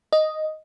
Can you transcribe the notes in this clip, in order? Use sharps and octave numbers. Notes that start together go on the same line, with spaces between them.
D#5